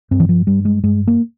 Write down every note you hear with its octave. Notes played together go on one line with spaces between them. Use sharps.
G2 C4
E3
F3
G2 G3
G#3
G2 G#3
A#3